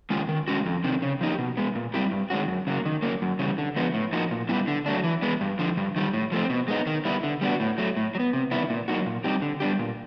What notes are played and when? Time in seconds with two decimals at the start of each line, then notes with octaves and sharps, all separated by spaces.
0.10 D#3 G#3 C#4 F4
0.29 D#3
0.48 G#3 C#4 F#4
0.66 F2
0.84 C3 D#3
1.02 C#3
1.21 F3 A#3 D#4 G4
1.39 B2
1.57 G#3 B3
1.75 A#2
1.94 G3 C4 E4 G4
2.11 G2
2.30 D#3 G#3 C#4 F#4
2.48 F#2
2.67 C#3 F#3 A#3
2.85 D#3
3.03 F#3 A#3 C#4
3.22 F#2
3.39 C#3 E3 G3
3.58 D3
3.76 F3 G#3 B3
3.94 A2
4.13 F3 A#3 D#4 F#4
4.31 A#2
4.49 G3 B3 E4
4.68 D3
4.86 F#3 A3 D4
5.04 E3
5.22 G#3 B3
5.41 G2
5.59 D3 F3
5.77 G2
5.96 D#3 G3
6.14 A2
6.32 F3 A3 C4
6.50 B2
6.68 G#3 B3 D#4
6.87 D#3
7.05 G3 B3 E4
7.23 D3
7.41 G3 B3 D4 F#4
7.60 A2
7.78 F#3 A3
7.96 A2
8.15 F#3
8.20 B3
8.33 C3
8.51 D#3 G3 B3 E4
8.70 A#2
8.88 F#3 A#3 D#4 F#4
9.06 A#2
9.24 G3 C4 D#4 G4
9.42 D3
9.60 G3 B3 D4 G4
9.79 A#2